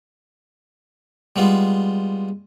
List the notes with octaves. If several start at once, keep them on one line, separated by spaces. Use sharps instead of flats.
G3 G#3 B3 F4